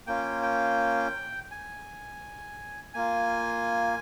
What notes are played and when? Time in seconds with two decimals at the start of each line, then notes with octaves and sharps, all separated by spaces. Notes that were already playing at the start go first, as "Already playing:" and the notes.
0.07 A#3 C#4 F4 G5
0.43 G5
1.51 G#5
2.94 A#3 F4 G#5